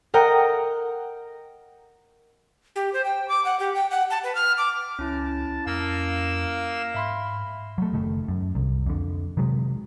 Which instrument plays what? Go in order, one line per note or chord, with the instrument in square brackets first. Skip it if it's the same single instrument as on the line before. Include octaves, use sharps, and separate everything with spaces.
[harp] A#4 D#5 F#5 G5 A#5
[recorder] G4
C5
G5
D6
F#5
G4
G5
F#5
A5
B4
F6
D6
[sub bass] C#2 [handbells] C#4 E4 [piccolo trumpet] A5
[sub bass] F2 [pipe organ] A#3 E6 [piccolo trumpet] F5
[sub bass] G#2 [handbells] E5 B5 C6
[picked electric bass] F#3 A3
F#1 D#3 A3
F#2
C2
F2 D3
C3 D#3 F#3 G#3